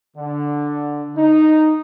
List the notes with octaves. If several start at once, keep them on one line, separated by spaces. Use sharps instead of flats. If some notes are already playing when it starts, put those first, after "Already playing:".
D3
D#4